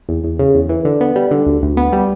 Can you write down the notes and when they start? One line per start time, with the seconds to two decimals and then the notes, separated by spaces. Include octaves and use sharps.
0.09 E2
0.24 E2
0.39 C#3
0.55 E2
0.69 E3
0.85 D3
1.01 B3
1.16 G3
1.31 D3
1.46 D2
1.62 D2
1.77 B3
1.93 G3